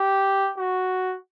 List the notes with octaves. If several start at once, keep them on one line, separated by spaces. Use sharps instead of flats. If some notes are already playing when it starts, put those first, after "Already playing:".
Already playing: G4
F#4